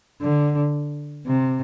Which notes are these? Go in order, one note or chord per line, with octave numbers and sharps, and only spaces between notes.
D3
C3